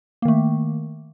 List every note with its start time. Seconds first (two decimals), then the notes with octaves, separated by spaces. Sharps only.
0.22 A#3
0.25 D#3
0.28 A3